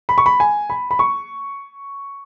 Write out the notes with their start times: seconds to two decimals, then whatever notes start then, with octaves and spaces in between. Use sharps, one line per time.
0.09 B5
0.18 C#6
0.26 B5
0.40 G#5
0.70 B5
0.91 B5
0.99 C#6